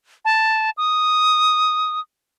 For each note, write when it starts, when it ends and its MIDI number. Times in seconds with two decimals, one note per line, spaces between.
0.25 0.70 81
0.77 2.00 87